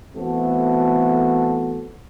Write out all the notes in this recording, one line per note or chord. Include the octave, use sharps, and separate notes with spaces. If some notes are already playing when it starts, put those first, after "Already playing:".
E3 A3 B3 C4 F#4 A4